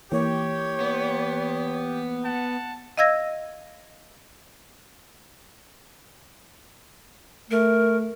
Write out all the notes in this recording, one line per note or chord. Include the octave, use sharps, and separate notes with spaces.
E3 A#3 G4 C#5
B3
F#5 A5
D#5 F5 E6 G#6 A#6
A3 A#4